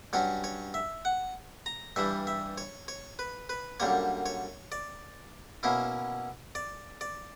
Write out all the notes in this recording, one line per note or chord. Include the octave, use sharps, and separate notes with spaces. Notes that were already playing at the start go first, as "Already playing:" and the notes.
G2 F#3 C#4 C#5
C#5
E5
F#5
A#5
G2 E3 G3 E5
E5
C#5
C#5
B4
B4
F#2 D3 G3 A#3 C#5
C#5
D5
B2 A#3 C#4 E4
D5
D5